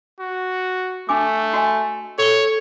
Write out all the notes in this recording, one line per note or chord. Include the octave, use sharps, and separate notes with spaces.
F#4
A3 D4 G#5 D6
F#4 D#5 G#5
A4 C#5 G7